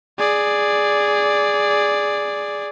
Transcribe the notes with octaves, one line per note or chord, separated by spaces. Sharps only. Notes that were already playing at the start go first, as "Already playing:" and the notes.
G#4 D5